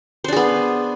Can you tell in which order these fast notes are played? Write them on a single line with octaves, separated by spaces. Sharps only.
C5 D4 G#4 B3